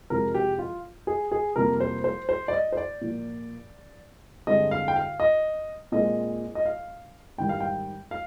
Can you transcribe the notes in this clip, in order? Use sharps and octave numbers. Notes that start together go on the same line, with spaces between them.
F2 C3 F3 G#3 A#4
G4
F4
G#4
G#4
F2 C3 G3 A#3 A#4
C5
C5
C5
D5
D#5
C5
D5
A#2 F3 A#3
G2 D3 G#3 C4 D#5
F5
G5
F5
D#5
A#2 G#3 C4 D#5
D#5
F5
G#2 D#3 G3 G5
F5
G5
F5